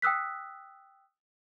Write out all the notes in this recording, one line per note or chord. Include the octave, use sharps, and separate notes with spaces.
G5 D#6 E6 F#6 B6